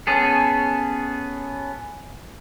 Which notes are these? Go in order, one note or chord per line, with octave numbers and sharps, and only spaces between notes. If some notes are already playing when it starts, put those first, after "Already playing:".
B3 C#4 G#4 A4